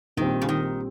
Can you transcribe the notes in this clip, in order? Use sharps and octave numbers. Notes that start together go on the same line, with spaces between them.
A#1 A#2 D#3 G3 C4
C#3
D#3